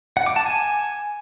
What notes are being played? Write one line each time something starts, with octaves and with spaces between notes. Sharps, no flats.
F#5
D6
A5
G#5